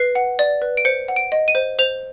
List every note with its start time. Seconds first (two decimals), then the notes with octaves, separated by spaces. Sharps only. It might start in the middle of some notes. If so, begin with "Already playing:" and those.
Already playing: B4 C7
0.15 F#5
0.39 D5
0.62 B4
0.77 D7
0.85 C5 C#7
1.08 F#5
1.16 D7
1.32 D#5
1.48 D#7
1.55 C5
1.79 C5 F7